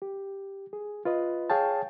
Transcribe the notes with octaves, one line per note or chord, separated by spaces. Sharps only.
G4
G#4
F4 B4 D#5
G#4 C#5 F5 G5 A5